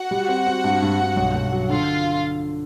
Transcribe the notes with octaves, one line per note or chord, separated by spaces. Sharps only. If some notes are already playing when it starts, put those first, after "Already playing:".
Already playing: F#4 F#5
G3
C4
C4
G2
G2
G2
B1
B1
F#3
D3 F4 F5